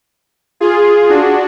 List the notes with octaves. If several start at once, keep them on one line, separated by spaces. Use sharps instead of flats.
F4 G#4
D4 F#4